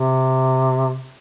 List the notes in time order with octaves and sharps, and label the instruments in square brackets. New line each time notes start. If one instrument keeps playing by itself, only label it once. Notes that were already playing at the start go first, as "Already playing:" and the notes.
Already playing: [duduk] C3